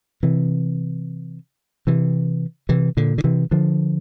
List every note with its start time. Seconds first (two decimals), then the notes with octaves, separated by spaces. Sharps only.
0.23 C3 E3
1.87 C3 E3
2.69 C3 E3
2.97 A#2 D3
3.18 D3
3.24 C3 E3
3.51 D3 F3